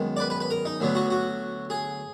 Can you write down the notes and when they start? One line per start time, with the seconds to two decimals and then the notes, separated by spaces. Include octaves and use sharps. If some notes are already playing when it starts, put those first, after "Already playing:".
Already playing: F#2 D#3 G#3 B3
0.17 D5
0.20 B4
0.30 B4
0.40 B4
0.50 A#4
0.65 D#4
0.80 D2 D3 F#3 B3
0.95 F#4
1.10 F#4
1.70 G#4